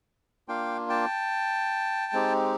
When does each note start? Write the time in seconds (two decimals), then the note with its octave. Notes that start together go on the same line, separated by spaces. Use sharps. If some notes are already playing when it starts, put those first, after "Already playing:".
0.48 A#3 D4 F4 F5 G5
0.89 G5 A5
2.13 G#3 C4 D#4 G4